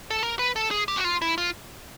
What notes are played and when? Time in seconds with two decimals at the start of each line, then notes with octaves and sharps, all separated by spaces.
0.10 A4
0.23 A#4
0.39 B4
0.56 A4
0.71 G#4
0.88 G4
0.97 F#4
1.04 F4
1.22 E4
1.38 F4